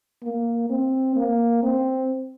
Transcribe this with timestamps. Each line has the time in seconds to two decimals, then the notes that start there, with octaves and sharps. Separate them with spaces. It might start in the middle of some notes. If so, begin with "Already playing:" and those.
0.23 A#3
0.70 C4
1.16 A#3
1.63 C4